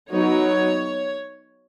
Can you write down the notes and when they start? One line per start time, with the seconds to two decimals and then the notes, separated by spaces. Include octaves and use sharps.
0.11 F#3 B3 D#4 C#5